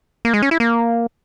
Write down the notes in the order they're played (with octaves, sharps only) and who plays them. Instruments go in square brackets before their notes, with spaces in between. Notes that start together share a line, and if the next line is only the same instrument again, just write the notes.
[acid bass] A#3
G#3
C#4
E4
A#3